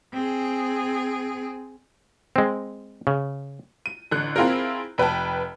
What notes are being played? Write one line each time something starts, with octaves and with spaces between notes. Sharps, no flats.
C4 G#4
G#3 C4
C#3
D#7
A1 D3 F#6
C4 E4 F4 G#4 A#4
F1 B4 G5 A5